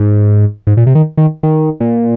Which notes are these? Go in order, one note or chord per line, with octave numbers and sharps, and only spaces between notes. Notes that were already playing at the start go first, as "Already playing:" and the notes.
Already playing: G#2
G#2
A#2
C3
D#3
D#3
D#3
A#2